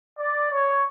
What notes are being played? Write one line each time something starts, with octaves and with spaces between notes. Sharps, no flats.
D5
C#5